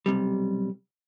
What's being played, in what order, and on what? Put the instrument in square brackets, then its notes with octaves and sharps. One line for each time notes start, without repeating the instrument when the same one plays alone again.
[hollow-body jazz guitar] B1 E2 C3 G3